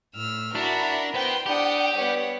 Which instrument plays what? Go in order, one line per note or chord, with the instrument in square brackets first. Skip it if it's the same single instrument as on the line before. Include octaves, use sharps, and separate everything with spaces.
[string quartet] A2 E6 F6
[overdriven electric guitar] D4 [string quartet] E4 A#4 [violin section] F#4 E5 B5
[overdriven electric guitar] B3 B4 [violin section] C5 G5 C6
[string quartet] D4 [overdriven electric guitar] G4 [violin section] F#5 G5 D#6
[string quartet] G3 B3 [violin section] C#5 F#5